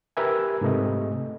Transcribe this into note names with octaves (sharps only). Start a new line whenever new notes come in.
G4 A#4 B4 E5 G#5
G#2 C3 A3 D#5